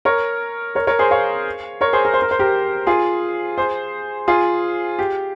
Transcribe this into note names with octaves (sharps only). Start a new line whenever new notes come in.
A#4 C#5
A#4 C#5
A#4 C#5
G#4 C5
C#5 F5
A#4 C#5
G#4 C5
A#4
C5
A#4
C5
G4 A#4
F4 G#4
G#4 C5
F4 G#4
G4